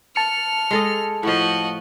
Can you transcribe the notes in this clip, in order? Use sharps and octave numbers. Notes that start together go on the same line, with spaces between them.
A5 F6 C#7
G#3 A4 D#5
A2 F3 F#4 D#5